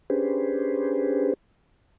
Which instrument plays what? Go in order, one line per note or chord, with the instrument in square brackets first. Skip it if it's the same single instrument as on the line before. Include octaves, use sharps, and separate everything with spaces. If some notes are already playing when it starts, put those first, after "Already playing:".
[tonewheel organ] C#4 D4 G4 G#4 B4 C5